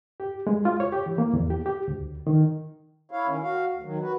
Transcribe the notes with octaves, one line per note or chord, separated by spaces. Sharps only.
G4
G#3
F4
C#5
G4
E3
A#3
E2
G4
G4
D2
D#3
E4 C#5 F5
D#3 C#4
F#4 F5
D2
D#3 F#3
F#4 B4